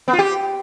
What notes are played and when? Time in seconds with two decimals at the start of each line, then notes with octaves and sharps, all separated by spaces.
0.08 B3
0.13 F4
0.19 G4